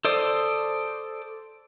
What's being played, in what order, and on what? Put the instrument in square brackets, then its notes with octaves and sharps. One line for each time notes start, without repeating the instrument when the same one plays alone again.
[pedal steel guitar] A4 C5 D5 D#6